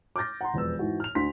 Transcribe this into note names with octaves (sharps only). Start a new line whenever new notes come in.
D6 F6 G6 A6 A#6
F#5 A#5 C6
E1 F2 B3 E6
G#2 E3 F#4
F6 F7
D2 D3 C6 B6